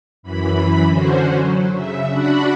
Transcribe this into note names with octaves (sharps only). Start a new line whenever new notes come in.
F#2 E3 B5
D3 C#4 F#4 C5
F#3
C#3 E5
D4 F#4 F#5 B5